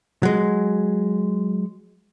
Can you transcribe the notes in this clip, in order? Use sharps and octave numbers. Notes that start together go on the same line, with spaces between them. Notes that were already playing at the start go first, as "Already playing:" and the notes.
F#3 G#3